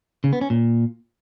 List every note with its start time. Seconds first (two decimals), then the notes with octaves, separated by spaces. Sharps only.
0.24 C#3
0.33 B3
0.41 C#4
0.50 A#2